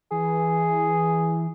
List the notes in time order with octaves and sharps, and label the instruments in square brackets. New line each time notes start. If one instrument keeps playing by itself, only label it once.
[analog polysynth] E3 [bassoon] G#4